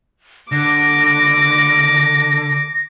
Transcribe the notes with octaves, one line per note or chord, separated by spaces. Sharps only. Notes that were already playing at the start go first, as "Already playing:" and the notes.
D3 D6 A#6